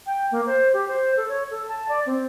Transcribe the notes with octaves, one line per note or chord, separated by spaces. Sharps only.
G5
A#3
C5
G4
C5
A4
C#5
A4
A5
D5
C4